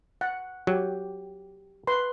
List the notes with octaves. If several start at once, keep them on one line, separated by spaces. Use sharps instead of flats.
F#5
F#3 G4
B4 C6